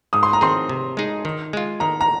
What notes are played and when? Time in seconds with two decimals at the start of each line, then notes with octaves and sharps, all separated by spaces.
0.13 G#2 D#6
0.23 C6
0.33 A#5
0.41 D#3 C4 G#4 C6
0.69 C3
0.97 G#3 D#4 G#4
1.25 D#3
1.53 G#3 F4
1.80 D#3 A#5
2.01 A#5